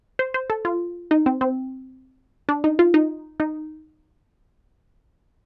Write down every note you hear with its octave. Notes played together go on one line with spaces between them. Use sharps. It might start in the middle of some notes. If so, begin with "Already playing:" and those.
C5
C5
A4
F4
D#4
C4
C4
D4
D#4
F4
D#4
D#4